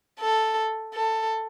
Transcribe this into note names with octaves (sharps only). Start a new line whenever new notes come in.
A4
A4